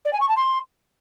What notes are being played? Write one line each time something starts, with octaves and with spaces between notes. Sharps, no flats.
D5
G#5
C#6
A5
C6